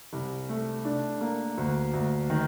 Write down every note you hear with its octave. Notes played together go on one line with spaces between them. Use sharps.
C2
A3
D4
A#3
D2
D2
D#3